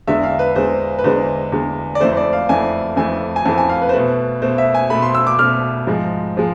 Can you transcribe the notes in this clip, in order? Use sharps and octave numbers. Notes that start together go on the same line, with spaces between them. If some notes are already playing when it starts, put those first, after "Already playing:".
E2 D3 G#3 E5
F5
B4
E2 D3 G#3 C5
B4
E2 D3 G#3 C5
E2 D3 G#3
D5
F2 E3 A3 C5
C5
D5
F5
F2 E3 A3 G#5
F2 E3 A3 G#5
G#5
F2 E3 A3 A5
G#5
F5
B4
C5
B2 A3 B4
B2 A3 C5
E5
G#5
B2 A3 B5
C6
E6
D6
B2 A3 F6
G#2 F3 G#3
F3 G#3